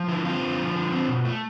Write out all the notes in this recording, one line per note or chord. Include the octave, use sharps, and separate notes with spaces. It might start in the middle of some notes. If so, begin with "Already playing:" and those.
Already playing: F3
D3 E4
C4 F4
D3
F3
D3
C4
B2
A3